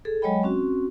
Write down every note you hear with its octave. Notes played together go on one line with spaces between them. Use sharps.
G#4 A4
F#3 G#3 C#5 D#5 G5 B5
C4 C#4 F#4